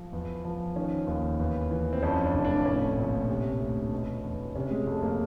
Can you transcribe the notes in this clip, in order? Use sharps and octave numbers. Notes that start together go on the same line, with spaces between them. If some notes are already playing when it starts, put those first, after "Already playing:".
Already playing: F3
E2
F3
D#3 C#4
D#2
E2
E3
C4
F2 C#4
D4
F1
D4
A2 C#4
A#1
C3
D2
B2
E2
C3 C#4
G#3
F2 A3
A#3